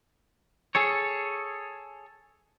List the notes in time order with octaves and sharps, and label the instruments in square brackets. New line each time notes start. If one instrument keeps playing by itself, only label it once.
[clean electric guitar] G#4 A4 C#5